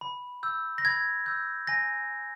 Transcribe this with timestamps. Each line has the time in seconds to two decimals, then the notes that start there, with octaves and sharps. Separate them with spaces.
0.01 B5
0.43 E6 G6
0.78 A#6
0.85 B5 G#6
1.26 E6 G6
1.67 G#5 A#6